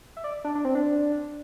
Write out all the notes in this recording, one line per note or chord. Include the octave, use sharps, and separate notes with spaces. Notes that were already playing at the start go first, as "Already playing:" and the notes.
E5
D5
D4
D4
C4
D4